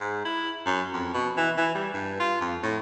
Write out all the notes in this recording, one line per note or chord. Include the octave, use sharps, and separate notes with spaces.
G#2
E4
F#2
F2
B2
E3
E3
G3
G2
F4
F2
A2